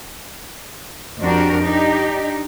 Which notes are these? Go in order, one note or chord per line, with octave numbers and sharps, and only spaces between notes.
F2 D4 F#4 G4 A#4
D4 D#4 G4